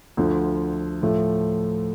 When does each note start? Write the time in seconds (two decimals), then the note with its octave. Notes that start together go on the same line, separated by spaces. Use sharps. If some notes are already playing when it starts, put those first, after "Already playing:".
0.17 D2 D3 F3 A3
1.02 A2 F3 A3